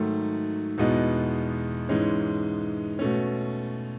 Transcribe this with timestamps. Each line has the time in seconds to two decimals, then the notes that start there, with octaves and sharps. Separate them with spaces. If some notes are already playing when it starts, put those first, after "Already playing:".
Already playing: G#2 D#3 F#3 A3
0.78 E2 B2 G#3 B3 D#4
1.89 G#2 E3 G#3 C#4
2.99 B2 A3 C#4